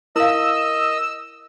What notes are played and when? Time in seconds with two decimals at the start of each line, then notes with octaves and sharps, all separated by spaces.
0.16 E4 A#4 D#5 F5 E6